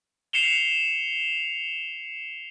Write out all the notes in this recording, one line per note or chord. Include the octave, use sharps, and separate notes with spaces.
C7 C#7 E7 F7 G7